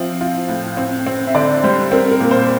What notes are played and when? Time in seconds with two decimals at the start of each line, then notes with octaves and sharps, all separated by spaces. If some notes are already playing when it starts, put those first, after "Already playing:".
Already playing: F3 C4 E5
0.21 F4
0.48 A2
0.77 C4
1.06 C4
1.27 E5
1.34 D3 D5
1.64 G3 C5
1.92 C4 A#4
2.11 A#4
2.20 A#2
2.31 C5